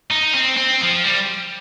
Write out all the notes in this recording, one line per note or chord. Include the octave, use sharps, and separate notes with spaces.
D#4
C4
C4
F3
G3